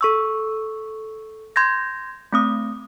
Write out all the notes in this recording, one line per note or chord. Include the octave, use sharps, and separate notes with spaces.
A4 C#6 E6
C6 G6 G#6 A#6
A3 C4 D#6